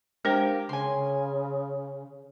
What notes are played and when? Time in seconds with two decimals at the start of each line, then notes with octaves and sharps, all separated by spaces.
0.25 G#3 D4 G4 A#4 C5 F5
0.69 C#3 G#5 C6